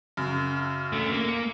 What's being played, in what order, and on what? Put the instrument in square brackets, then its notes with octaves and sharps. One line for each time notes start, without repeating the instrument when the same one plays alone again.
[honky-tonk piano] F#2 C#3
[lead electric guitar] A3 D4
A#3
[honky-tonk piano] C#7